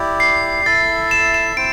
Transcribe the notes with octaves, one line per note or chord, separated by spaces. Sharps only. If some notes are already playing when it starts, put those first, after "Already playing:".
Already playing: E4 G4 D5
C7
E4 A4 E5 A6
E7
E7
C4 E4 C5 D7